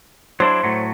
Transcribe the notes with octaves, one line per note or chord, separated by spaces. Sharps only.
F#3 D4 E4 C5
A2 F#3 A3